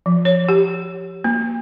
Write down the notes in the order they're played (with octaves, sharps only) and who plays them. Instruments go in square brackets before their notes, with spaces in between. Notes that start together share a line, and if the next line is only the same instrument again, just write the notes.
[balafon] F3
C#5
G4
A#3